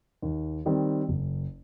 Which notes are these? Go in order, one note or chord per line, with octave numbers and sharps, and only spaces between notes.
D#2
D#3 G3 C4
F#1